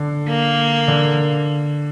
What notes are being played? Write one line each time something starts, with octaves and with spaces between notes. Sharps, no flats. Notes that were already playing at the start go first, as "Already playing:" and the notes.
Already playing: D3
A#3
D3